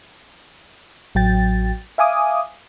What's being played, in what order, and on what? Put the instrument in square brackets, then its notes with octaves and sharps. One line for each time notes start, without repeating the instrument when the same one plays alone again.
[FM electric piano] A1 F#3 G5 A6
E5 F5 G#5 D6 D#6